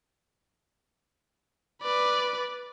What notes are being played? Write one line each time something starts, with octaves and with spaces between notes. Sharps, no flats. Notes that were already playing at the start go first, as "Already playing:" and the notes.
B4 D5